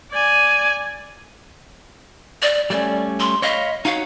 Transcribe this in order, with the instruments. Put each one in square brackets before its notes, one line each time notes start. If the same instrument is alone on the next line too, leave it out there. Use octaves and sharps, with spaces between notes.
[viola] D5 G#5
[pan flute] D5
[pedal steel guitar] G3 A3 C#4 [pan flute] D5
[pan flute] C6
[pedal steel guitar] C#5 F5 B5 [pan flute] D#5
[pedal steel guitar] D#4 F#4 C#5 [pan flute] F5